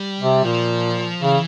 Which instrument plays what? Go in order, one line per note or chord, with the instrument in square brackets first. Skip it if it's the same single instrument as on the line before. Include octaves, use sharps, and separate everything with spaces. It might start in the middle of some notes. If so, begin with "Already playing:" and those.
Already playing: [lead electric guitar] G3
[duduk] C3
[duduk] A#2 [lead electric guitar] F3
[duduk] C#3 [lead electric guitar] E3